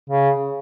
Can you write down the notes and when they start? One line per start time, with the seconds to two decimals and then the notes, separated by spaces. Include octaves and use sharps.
0.10 C#3